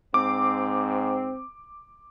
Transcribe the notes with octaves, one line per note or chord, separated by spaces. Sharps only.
G#2 C4 D6